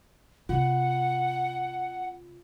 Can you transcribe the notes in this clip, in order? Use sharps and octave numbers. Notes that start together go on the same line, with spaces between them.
C3 F4 F#5